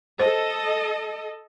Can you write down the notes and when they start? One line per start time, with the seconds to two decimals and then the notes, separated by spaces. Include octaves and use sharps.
0.19 A4 C5 D#5